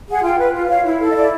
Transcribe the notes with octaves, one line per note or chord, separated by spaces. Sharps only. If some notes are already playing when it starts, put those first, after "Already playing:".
G#4 F#5
F4 G5
B4
F4
C#5 F5
E4
A4
D#5
E4 D5